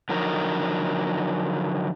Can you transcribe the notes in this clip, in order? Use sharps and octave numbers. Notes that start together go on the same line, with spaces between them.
D3 F3 F#3 D#4 A#4